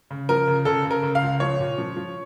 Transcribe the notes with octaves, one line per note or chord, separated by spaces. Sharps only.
C#3
F3 A#4
C#3
C#3 A4
C#3
A#4
C#3
F5
C#2
F3 C#5
A#2
F3
F3